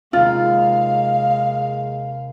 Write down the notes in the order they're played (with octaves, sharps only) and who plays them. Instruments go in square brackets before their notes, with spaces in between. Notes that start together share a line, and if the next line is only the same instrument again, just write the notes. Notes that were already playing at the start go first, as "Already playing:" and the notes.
[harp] D#2 C3 A#3 [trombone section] G#3 [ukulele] F4 [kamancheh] F5